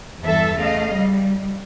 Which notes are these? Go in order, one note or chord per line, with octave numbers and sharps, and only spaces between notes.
E2 G2 E3 A4 E5
C#3 A3 D#5 F5
G3